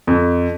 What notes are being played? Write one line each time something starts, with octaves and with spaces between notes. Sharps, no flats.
F2